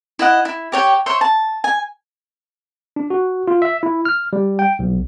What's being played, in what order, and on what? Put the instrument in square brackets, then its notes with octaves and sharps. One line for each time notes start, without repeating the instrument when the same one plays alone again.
[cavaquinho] E4 D#5 F#5
E4
G4 C#5 G5
C5 C#5 E5 C6
A5
G#5
[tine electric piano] D4
F#4
F4
E5
E4
F6
G3
G5
B1